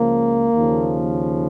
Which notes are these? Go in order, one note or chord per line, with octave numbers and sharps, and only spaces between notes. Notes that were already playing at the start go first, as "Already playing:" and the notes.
Already playing: C#2 C#3 F3 A#3
D#2 C#3 F3